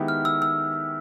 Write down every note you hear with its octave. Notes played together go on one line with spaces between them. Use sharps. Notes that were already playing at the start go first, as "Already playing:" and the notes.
Already playing: D#3 G#3 B3 E4 G4
F6
E6
E6